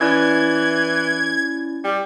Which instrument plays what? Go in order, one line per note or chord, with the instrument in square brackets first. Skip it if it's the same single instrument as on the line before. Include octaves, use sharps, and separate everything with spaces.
[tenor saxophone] E3 [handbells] C#4 E4 D5 [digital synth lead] G#6
[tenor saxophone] G3